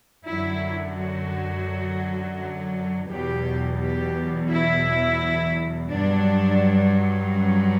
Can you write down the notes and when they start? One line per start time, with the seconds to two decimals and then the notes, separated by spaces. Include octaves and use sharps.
0.24 F#2 D3 F#3 E4
0.95 F#4
3.07 E2 B2 F#3 G4
3.79 G4
4.50 E4
5.91 G2 F#3 D4
7.32 C#4